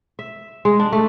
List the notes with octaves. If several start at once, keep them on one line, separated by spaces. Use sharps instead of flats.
E5
G#3
D4
A3